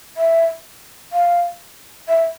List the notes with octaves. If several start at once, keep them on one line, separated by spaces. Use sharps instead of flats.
E5
F5
E5